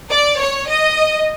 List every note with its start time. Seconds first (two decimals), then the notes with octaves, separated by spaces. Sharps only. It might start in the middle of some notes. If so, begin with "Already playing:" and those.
0.11 D5
0.40 C#5
0.69 D#5